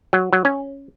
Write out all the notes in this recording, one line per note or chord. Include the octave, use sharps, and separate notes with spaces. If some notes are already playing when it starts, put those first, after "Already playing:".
F#3
F#3
C#4